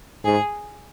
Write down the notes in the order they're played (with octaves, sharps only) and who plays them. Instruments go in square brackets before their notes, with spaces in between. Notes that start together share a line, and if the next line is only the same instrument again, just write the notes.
[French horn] G#2 [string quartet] G#4